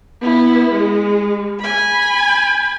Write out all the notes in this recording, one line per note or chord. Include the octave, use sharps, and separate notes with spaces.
B3 E4
G#3
G#5 B5